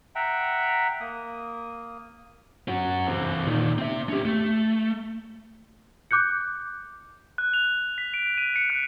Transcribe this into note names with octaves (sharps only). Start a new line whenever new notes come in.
E5 F#5 G5 A#5
A#3 D#6
C#4 F#4
E3 C4
A#2 D#3
C4 E5
C#4 G4
A3
D6 F#6 G6 C#7
F#6
F7
B6
D7
D#7
C#7
F#6